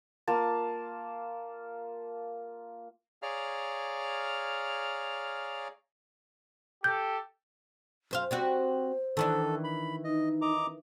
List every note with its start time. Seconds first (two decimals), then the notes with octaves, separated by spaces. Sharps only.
0.28 A#3 F4 A5
3.22 G#4 C#5 D5 F5 A#5 F6
6.84 G4 A4 G6
8.11 F#2 C5 F5
8.31 G3 C4 F#4 C5
9.17 D#3 E3 D4 A4
9.64 B5
10.04 D#4 D#5
10.42 D#5 A#5 D6